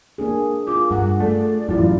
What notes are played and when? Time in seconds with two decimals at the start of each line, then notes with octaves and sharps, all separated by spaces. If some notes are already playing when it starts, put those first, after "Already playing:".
0.18 A#3 D4 G#4
0.67 F4 D6
0.91 G2 F#5
1.20 A3 D5
1.69 A1 F#2 E4 F4